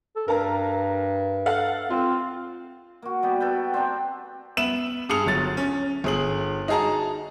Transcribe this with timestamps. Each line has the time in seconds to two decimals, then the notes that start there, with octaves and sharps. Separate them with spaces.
0.16 A4
0.28 G2 A#4 A5 A#5
1.46 A4 F5 F#5
1.90 C4 F4
3.02 A#3 F#4
3.22 G3 B3 G4
3.40 A4 B4 G5
3.74 C4 D4 G5 A#5
4.57 B3 E5 E7 F#7
5.09 G2 G#4 D#6 C#7 F7
5.26 G1 F#3 A6
5.57 C#4
6.04 G1 G#4 F#7
6.68 D#4 F#4 G#4 A5 A#5